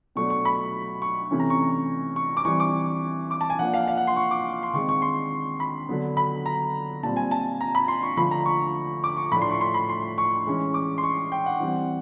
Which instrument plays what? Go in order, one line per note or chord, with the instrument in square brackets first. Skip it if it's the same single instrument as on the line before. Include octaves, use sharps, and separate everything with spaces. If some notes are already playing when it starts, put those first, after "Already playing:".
[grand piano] B2 F#3 A3 D4 C#6
C#6
B5
C#6
C3 E3 A3 C#4
A#5
C#6
C#6
D6
E3 G3 C4 C#6
D6
D6
A5
G#5
F3 A#3 D4 F#5
F5
F5
F#5
C6
C#6
D6
C6
D#3 G#3 C4 C#6
C#6
C6
B5
D3 F#3 B3 D4
B5
A#5
A#2 G3 C4 A5
G#5
A5
A#5
B5
C6
C#6
D3 F3 A3 B5
A#5
C#6
D6
C#6
A2 F3 A3 D4 B5
C6
C#6
C6
B5
C6
C#6
E3 G#3 C#4
D6
C6
C#6
G5
F#5
E3 G3 C4